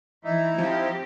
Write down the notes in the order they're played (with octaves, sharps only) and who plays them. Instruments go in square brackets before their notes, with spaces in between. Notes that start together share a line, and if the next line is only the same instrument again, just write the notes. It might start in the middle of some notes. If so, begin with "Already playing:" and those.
[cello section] E3 F3 [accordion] D#4 E4
[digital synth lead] F3 [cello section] C4 G4